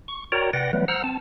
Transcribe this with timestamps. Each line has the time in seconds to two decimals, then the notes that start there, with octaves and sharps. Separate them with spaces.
0.08 C#6
0.32 F#4 A#4 C#5 D5 G5 A#5
0.53 C3 B4 D5 F#5 G5 A#6
0.73 E3 F#3 G3 A3 B3 B4
0.88 C5 F#5 A#5 E6 F6
1.04 C4 A5